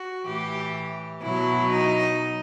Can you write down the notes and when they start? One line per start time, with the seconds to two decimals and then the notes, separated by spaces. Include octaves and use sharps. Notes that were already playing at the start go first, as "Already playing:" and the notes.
Already playing: F#4
0.25 A2 E3 G4
1.21 B2 F#3 E4
1.70 D#4